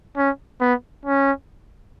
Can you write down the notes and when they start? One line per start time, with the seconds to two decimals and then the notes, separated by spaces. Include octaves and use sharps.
0.17 C#4
0.61 B3
1.06 C#4